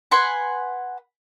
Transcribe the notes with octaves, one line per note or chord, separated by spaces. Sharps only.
B4 F#5 G#5 C6